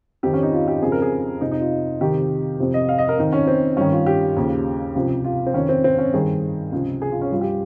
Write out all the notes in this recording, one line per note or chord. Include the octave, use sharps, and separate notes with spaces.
F2 D#3 G4
C#4
D#4
F4
G4
F2 C#3 F3 G#4
A#4
G#4
F2 C3 F3 D#4
D#4
F4
F2 C3 D#3 G4
F2 C3 F3
D#5
F5
D#5
A#4
F2 D#3 D#4
C#4
C4
G2 D#3 C#4
F4
G4
D#2 C#3 F3
C#2 C3 F3
F4
C4
F2 D#3 C#4
C4
C4
C#4
G2 D#3 G#4
C#2 C3 F3
G#4
F4
C#4
G2 F3 F4
G4